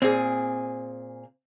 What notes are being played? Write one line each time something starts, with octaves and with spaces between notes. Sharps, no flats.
A#2 C4 G#4